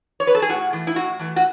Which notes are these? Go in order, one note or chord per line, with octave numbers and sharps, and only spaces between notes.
C#5
B4
A4
G#4
A2 F#4
E3 A3
E4
A2 F#4
E3 A3
F#4